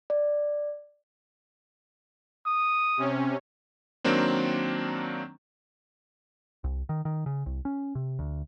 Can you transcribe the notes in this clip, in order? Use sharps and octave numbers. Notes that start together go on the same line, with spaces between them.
D5
D#6
C3 C#4
D#3 F#3 A#3 C4 D4
C2
D#3
D#3
C#3
C2
C#4
C3
D2